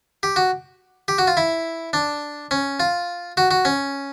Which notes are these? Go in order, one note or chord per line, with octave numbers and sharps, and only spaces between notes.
G4
F#4
G4
F#4
F4
E4
D4
C#4
F4
F#4
F#4
C#4